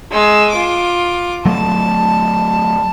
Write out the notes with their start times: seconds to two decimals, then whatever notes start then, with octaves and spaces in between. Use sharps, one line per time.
0.11 G#3 E6
0.51 F4 D6
1.45 F#3 A3 A5